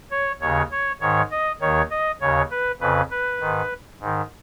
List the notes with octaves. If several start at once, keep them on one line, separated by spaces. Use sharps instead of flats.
C#5
D#2 C#3 C#5
C#5
G#2 D#3 C#5
D#5
D#2 D#3 C#5
D#5
D#2 C#3 C#5
B4
F2 C#3 B4
B4
G#2 D#3
G#2 D#3